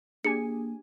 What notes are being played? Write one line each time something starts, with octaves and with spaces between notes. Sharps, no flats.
A#3 D4 G4 G#4 G#5 C#7